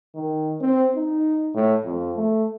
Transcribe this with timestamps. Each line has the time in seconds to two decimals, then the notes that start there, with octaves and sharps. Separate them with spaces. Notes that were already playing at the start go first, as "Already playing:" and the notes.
0.15 D#3
0.61 C4
0.96 D#4
1.54 A2
1.84 F2
2.16 A3